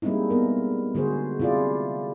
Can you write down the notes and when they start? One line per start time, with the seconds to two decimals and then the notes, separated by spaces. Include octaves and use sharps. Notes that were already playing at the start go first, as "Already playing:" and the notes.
0.02 G3 G#3 A#3 C4 D#4 E4
0.30 B3 A#4
0.95 D3 G#3 F#4 G#4 C5
1.40 C3 E4 F4 G#4 D5